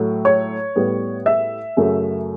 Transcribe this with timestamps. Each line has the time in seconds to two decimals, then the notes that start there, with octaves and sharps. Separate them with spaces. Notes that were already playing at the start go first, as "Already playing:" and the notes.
Already playing: A2 F#3 A3
0.25 C#5
0.76 A2 G3 B3
1.26 E5
1.77 F#2 C#3 F#3 A3